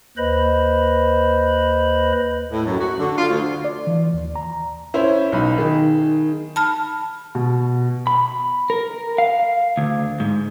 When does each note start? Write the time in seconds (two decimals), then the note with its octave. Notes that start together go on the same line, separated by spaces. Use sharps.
0.17 D#2 B4 C5 D#5 B5
2.53 A2
2.66 F#2
2.80 F#4
3.00 D3
3.18 F4
3.30 D2
3.65 D5
3.87 E3
4.14 D#2
4.36 A#5
4.94 C#4 E4 C5
5.32 B1 D#4 B5
5.58 D#3 G#4
6.56 A5 B5 F6
7.35 B2
8.07 B5
8.70 A#4
9.18 F5
9.77 D2
10.20 G#2